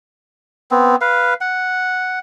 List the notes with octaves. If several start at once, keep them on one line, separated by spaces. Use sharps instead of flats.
B3 C4
B4 F5
F#5